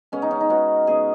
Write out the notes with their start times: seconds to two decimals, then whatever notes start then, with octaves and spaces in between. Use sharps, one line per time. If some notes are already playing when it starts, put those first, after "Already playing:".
0.12 C#3 G#3 B3 C#4
0.22 D#4
0.31 C#4
0.41 D#4
0.49 C#3 G#3 B3 F#4
0.87 C#3 G#3 B3 G#4